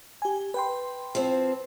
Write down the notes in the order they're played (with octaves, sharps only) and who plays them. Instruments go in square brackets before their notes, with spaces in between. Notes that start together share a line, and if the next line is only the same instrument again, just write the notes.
[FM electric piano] G4 G#5
B4 G5 C6
[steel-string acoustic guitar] F3 C4